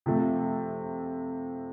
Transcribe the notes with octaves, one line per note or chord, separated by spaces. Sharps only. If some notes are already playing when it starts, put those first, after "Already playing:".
C3 F3 A3